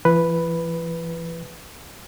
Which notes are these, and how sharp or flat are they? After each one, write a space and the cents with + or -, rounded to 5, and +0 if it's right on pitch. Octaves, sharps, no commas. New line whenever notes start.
E3 +40 B4 +0